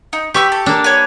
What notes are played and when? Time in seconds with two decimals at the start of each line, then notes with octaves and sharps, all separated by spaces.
0.13 D#4
0.34 G4 B4 C#6 E6
0.52 A4
0.66 A#3 D4
0.84 B4 C#5